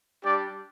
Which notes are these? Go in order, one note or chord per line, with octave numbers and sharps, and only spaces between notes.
G3 D4 G4 D5